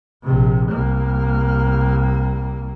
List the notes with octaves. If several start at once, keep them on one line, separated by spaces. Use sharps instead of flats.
A#1 C3
C2 A#3